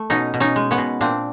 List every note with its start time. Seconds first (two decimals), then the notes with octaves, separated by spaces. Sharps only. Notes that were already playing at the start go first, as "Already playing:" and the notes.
Already playing: A3
0.10 B2 C#4 D#4
0.34 B2
0.40 C#4 D#4
0.56 G#3
0.71 B3 C#4
0.78 B2
1.01 A#2 C4 D4